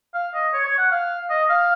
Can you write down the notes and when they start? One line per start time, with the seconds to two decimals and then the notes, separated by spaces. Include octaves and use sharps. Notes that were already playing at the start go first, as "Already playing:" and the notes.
0.14 F5
0.34 D#5
0.53 C#5
0.65 C#5
0.78 F#5
0.91 F5
1.30 D#5
1.50 F5